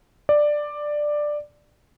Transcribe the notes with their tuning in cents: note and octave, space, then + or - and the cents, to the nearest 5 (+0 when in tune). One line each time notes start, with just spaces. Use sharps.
D5 +10